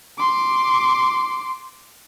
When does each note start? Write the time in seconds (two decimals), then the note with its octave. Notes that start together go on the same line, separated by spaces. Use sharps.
0.18 C6 D6